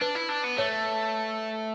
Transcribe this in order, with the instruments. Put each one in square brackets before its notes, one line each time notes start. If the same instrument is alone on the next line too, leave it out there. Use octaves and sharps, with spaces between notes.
[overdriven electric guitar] D4 [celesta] B4
[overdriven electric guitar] E4
D4
B3
[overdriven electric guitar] A3 [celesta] C#5